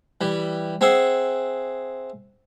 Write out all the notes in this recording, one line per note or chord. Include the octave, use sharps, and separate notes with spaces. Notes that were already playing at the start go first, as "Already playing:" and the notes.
E3 G3
C4 G#4 E5 F#5 C6